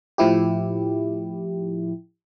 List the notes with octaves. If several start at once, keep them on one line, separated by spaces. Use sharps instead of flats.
A2 F3 E4 G4